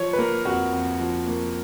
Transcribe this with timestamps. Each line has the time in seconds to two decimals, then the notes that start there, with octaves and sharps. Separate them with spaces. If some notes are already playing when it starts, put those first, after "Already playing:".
Already playing: F3 C#5
0.13 B4
0.18 A#3 A#4
0.45 F2 F#4
0.73 F2
1.00 F3
1.27 A#3